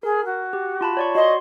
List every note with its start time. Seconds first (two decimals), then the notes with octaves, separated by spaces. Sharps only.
0.03 G#4 A#4
0.25 F#4
0.53 G4
0.81 F4 A5 B5
0.97 C#5 D5 C#6
1.15 F#4 D#5 C6